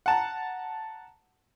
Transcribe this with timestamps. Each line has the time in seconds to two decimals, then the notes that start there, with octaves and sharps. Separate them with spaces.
0.06 F#5 A5 A#5